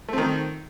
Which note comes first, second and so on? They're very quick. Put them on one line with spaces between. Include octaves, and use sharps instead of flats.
A3 C4 D#3